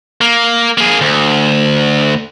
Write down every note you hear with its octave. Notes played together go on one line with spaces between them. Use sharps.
A#3
A#3 G#4
D2